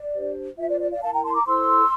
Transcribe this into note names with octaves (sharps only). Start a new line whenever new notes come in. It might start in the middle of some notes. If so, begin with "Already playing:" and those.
Already playing: D5
D4 G4 C5
F4 C5 E5
D5
D5
D5 F5
E4 A#4 F5 A5
G5 A#5
A5 C6
A#5 D6
E4 A4 C5 C6 E6